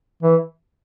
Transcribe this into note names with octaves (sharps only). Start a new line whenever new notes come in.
E3